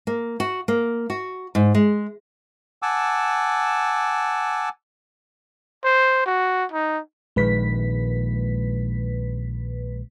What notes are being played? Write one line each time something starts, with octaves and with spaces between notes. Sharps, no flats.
A#3
F#4
A#3
F#4
G#2
G#3
F#5 G#5 A5 D6 E6
C5
F#4
D#4
A#1 D#3 G#3 B4 B6